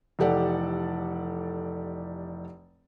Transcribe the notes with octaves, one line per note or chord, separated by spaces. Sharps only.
F1 E3 G4 A4 D5 F#5